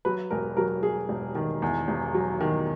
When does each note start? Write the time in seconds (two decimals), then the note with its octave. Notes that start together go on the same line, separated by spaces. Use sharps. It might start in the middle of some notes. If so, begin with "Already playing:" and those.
0.05 F#3 B4
0.31 E1 A#4
0.57 F#3 A#4
0.83 F#3 G#4
1.09 E1
1.35 D#3
1.62 E2
1.88 E1
2.14 F#3
2.40 D#3